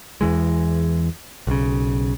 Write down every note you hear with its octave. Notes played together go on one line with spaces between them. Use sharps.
E2 E3 G#3
B1 C#3